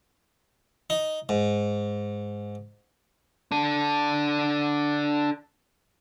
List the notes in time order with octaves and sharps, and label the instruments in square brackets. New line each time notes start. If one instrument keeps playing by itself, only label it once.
[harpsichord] D#4
G#2
[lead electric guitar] D4 A4